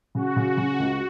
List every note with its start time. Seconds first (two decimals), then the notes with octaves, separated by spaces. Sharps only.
0.15 C#3 F#4
0.36 C#3
0.57 C#3
0.80 C#2